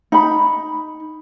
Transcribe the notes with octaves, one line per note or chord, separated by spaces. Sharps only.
D#4 B5